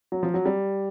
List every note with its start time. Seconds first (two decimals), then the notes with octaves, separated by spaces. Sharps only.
0.12 F#3
0.23 F3
0.34 F#3
0.46 G3